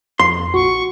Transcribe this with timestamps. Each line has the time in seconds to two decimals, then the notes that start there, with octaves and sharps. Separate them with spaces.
0.20 F2 C6
0.54 A#1 F#4 C#6